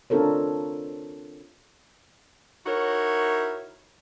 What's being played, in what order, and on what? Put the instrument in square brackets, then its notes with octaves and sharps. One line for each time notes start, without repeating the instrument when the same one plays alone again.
[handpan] C4 D4 F4 A4 A#4 C#5
[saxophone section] D#4 E4 F#4 A#4 C#5